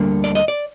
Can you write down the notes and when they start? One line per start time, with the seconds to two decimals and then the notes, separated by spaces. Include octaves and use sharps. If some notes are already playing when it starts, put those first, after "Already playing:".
Already playing: D2 D3 G3 A#3 D4
0.24 D5
0.35 D#5
0.48 D5